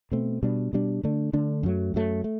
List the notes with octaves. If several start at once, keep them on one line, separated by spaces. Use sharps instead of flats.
B2 A3 C4
B2 G3 D4
B2 G3 D4
D3 A3 D4
D3 A3 D4
F#2 F#3 A3
F#2 F#3 A3
A3